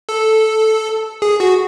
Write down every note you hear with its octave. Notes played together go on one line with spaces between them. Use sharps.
A4
G#4
F#4